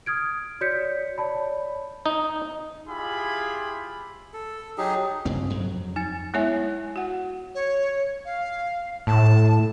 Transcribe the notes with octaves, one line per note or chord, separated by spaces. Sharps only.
D#6 F6 G#6 D7
F#4 C#5 D5 G6 B6 C#7
C#5 D5 A5 B5
D#4
E4 F4 G4 G#4 B5
A4
F#3 D#4 G4 G#4
G2 C#3 C4
F2 F#3
D#4 G#5 A6
G#3 B3 E4 C#5 E5 G#5
F#4 F#5
C#5
F5
A2 A5